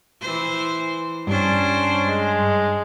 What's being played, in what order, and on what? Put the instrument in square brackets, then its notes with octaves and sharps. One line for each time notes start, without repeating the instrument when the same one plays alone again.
[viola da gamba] E3 C5
[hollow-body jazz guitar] G2 [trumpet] C#4 [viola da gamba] D4 C5
[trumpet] G#3